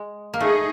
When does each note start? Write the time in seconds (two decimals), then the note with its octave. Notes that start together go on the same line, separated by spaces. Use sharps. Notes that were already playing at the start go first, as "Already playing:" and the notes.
Already playing: G#3
0.34 A#3
0.40 A3 D#4 G#4